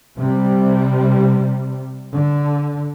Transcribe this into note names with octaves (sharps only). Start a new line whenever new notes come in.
C3 G3
D3